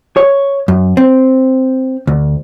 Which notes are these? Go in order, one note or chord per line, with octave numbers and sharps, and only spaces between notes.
C#5
F#2
C4
D2